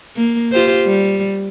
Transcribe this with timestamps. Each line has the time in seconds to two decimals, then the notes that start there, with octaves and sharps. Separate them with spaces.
0.16 A#3
0.52 F4 G4 C5
0.86 G3